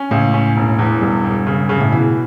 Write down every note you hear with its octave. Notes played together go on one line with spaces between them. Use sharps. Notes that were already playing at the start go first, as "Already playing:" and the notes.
Already playing: C#4
C#2 A2
C#4
E1
E2
E1 G2
E1
C#3
C#3
A2
B2 E3